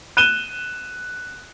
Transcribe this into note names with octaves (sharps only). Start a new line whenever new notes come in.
F#6 D#7 E7 G7